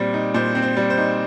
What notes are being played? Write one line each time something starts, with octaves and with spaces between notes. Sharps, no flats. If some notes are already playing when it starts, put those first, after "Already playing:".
Already playing: A#2 G3 C4
D#4
A#2 C5
C4
C5
G3
C5
D#4